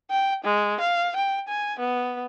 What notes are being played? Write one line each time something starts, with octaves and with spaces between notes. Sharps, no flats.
G5
G#3
F5
G5
G#5
B3